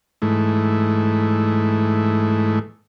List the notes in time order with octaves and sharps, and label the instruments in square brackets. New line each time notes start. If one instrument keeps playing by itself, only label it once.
[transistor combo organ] G#2 E3 A3